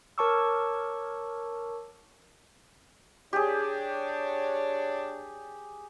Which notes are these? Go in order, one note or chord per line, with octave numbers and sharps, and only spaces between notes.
A#4 C#5 A5 C#6 D6 E6
D4 G4 G#4 C#5